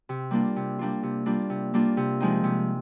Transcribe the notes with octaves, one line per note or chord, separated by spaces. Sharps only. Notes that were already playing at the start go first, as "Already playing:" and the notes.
C3
G3 A#3 D4 F4
C3
G3 A#3 D4 F4
C3
G3 A#3 D4 F4
C3
G3 A#3 D4 F4
C3
F3 G#3 C4 D#4
C3